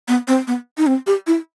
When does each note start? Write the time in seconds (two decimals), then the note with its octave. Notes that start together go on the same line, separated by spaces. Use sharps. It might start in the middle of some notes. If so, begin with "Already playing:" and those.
0.08 B3
0.28 C4
0.47 B3
0.78 D#4
0.87 C4
1.07 G4
1.27 E4